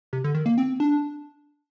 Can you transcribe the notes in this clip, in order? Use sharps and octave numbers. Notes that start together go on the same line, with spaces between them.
C3
D3
D#3
A#3
C4
D4